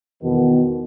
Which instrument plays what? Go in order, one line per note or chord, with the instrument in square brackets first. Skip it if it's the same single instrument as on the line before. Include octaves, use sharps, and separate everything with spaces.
[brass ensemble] E2 B2 D#3